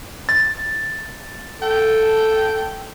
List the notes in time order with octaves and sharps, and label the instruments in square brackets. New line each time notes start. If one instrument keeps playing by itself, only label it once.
[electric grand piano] A6
[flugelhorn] A4 [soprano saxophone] G5